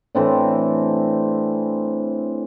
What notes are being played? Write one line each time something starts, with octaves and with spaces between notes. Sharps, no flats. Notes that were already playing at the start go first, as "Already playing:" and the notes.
A2 E3 C4 D4